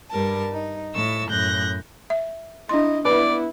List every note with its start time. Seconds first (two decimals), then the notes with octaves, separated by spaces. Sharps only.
0.10 G2 G3 A#4 A5
0.52 D#4
0.94 A2 C#6 E6 A6
1.30 F#2 A2 F#6 G6 A#6
2.10 E5
2.69 D4 E4 D#5 C6
3.05 B3 E4 B4 D5